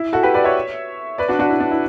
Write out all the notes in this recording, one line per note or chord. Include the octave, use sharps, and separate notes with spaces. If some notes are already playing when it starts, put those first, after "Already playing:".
Already playing: E4
F#4 A4
G4 B4
B4 D5
C#5 E5
B4 D5
D4 F#4
D4 F#4
E4
D4
E4